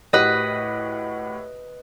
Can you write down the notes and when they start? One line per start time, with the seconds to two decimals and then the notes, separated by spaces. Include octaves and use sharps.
0.13 A2 F#4 G4 B4 D#5